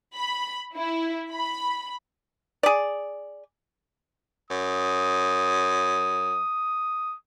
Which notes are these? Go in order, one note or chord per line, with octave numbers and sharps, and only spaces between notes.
B5
E4
B5
G#4 D5
F#2 D#6